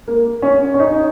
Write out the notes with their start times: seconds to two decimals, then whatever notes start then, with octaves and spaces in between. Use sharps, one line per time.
0.08 A#3
0.42 C#4
0.74 C#4
0.79 D#4